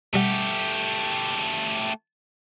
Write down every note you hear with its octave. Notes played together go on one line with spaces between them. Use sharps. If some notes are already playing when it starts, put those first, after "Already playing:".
B2 G3 A3 G4 F#5